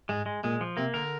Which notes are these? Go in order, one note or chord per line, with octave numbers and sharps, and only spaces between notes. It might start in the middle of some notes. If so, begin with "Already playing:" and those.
G#2 G#3
G#3
A#2 G#3
F3
C3 A#3
D3 A#4